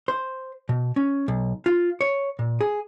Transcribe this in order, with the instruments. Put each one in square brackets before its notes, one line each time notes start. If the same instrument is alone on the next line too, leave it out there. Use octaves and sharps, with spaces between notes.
[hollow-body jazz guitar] C5
B2
C#4
B1
F4
C#5
A#2
G#4